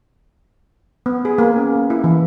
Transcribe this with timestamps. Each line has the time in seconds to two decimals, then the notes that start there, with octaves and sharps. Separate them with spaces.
1.06 B3
1.25 G#4
1.38 A#3
1.56 C#4
1.76 A#3
1.90 E4
2.04 E3